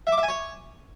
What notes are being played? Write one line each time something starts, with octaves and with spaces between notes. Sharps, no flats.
E5
D6
E5
G#5
C#5